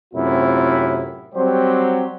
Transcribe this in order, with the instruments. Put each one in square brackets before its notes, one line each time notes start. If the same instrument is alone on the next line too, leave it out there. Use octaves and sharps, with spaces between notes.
[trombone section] F#2 A2 C3 C4 E4 F4
F#3 G3 C4 G4 C5